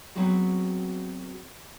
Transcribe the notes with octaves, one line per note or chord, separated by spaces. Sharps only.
F#3 B3 C4 F#4 G#4